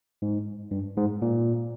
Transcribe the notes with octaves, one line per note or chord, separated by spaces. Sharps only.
G#2
G2
G#2
A#2